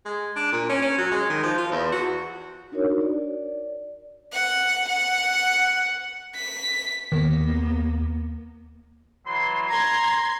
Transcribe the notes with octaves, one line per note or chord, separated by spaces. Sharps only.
G#3
D4
A#2
C#4
C#4
F#3
G#3
D#3
F3
F4
E2
F#4
D4 D#4 F#4 A#4 C#5
D5
F#5
F#5
B6
D#2 D#3 A#3 B3
E3 F#3 C6
A#5 C6 G#6